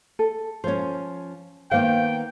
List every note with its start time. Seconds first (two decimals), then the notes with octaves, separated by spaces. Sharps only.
0.19 A4
0.64 F3 C#4 C5 C#5
1.71 D#3 A#3 B3 C5 F5 G5